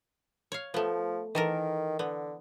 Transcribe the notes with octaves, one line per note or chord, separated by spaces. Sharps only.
C#5 F5
F3 A3 B3
D#3 E3 A4 A#4
D3 B3